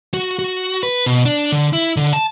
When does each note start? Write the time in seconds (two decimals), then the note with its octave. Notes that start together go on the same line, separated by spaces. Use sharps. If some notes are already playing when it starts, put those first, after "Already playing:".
0.14 F#4
0.39 F#4
0.83 B4
1.06 B2
1.25 D4
1.52 D3
1.73 E4
1.97 D3
2.13 A5